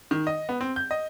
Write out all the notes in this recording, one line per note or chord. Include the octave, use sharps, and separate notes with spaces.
D#3
D#5
B3
C4
G6
D#5